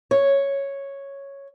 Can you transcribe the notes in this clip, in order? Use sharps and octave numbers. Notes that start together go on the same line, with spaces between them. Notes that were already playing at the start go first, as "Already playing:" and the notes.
C#5